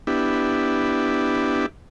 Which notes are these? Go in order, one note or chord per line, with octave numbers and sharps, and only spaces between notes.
B3 D4 E4 G4